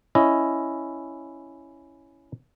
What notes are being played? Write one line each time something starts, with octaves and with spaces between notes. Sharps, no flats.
C#4 E4 D#5